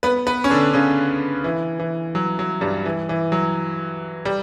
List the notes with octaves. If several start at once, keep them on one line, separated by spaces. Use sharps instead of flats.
B3 B4
B3 B4
C#4
D3 D4
C#3 C#4
E3
E3
F#3
F#3
G2 G3
E3
E3
F#3
G3